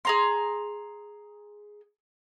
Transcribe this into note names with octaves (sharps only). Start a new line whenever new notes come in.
G#4 A#5 C6